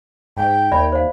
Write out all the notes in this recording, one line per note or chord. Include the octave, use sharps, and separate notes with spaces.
G#2 G5
D#2 D5 E5 B5
C5 F5